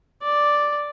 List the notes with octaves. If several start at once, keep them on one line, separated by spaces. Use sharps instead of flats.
D5